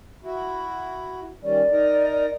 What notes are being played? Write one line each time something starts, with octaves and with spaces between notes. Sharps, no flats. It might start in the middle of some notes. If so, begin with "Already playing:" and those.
E4 F#4
D#3 G3 C#4 D5
D#4 A#4